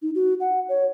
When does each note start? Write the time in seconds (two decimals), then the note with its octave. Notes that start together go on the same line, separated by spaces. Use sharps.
0.02 D#4
0.15 F#4
0.40 F#5
0.69 C#5